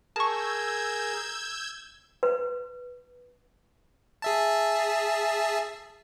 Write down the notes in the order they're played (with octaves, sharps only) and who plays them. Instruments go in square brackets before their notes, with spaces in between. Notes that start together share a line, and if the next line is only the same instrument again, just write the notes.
[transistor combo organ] G#4 A#4 [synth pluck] A5 C#6 [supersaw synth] E6 G6 G#6
[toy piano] B4
[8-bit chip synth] G#4 E5 A5